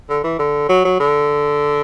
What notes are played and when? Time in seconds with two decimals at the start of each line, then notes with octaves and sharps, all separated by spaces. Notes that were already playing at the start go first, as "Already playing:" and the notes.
0.09 D3
0.24 E3
0.39 D3
0.69 F#3
0.85 F#3
1.00 D3